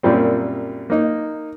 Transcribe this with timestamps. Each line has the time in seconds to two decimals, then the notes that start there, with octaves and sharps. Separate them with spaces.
0.03 F#2 A#2 G3 C4
0.90 A#3 D#4